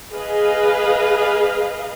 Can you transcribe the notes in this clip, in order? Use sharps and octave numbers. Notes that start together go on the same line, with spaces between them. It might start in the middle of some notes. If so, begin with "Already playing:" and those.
G#4 B4 D#5 F5